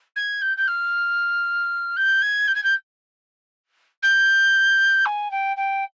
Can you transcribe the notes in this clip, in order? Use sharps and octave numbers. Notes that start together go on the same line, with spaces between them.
G#6
G6
G6
F6
G6
G#6
G6
G#6
G6
G6
G#5
G5
G5